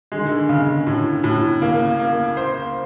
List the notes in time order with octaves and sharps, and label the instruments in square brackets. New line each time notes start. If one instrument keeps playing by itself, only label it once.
[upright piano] D3 [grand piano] G#3
[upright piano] D#3
D3
[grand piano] C#3
A2
A2
[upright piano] C#3 [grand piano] A#3
[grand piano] A#3
C5